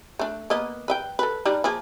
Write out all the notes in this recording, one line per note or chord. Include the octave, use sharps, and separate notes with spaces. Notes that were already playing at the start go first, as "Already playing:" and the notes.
A3 D4
A#3 B3 D#5
B4 D#5 G5
A4 B4
G3 D4 D#4
F3 A#3 G#4